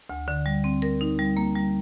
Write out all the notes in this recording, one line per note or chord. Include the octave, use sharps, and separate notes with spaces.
D2
D3
G3
C4
A#4
D#4
G3
A#3
G3